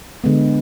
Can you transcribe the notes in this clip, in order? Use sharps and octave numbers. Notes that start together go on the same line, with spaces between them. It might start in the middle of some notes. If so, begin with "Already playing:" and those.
D3 G#3 B3